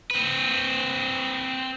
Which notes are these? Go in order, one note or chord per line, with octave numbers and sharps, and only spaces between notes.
C4 B4